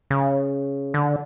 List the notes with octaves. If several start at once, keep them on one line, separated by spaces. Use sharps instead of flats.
C#3
D3